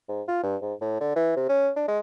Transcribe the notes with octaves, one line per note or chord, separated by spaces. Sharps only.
G#2
F4
G2
G#2
A2
D3
E3
C3
C#4
D4
G#3